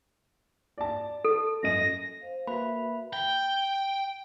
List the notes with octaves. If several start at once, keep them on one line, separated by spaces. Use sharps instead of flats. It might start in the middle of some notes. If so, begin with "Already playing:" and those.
D5 A5
A4
F#2 D#5 A#6 D#7
C5 F5
A#3 F#4 B4 E5 B5
G5